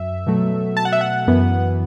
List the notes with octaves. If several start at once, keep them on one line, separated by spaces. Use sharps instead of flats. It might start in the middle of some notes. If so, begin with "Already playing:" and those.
Already playing: F#2 E5
B2 F#3 A3
A5
F#5
E5
F#5
F#2 E3 B3